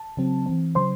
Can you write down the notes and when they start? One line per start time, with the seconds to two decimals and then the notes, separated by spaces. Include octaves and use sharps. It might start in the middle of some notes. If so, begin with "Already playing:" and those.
Already playing: A5
0.17 C#3 F#3 C4
0.46 E3 C4
0.75 C#3 F#3 C#4 C5 C6